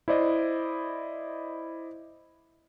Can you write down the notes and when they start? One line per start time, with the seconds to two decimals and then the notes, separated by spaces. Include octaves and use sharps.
0.08 E4 C5 D5 D#5